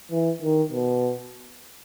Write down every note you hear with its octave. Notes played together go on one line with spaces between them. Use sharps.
E3
D#3
B2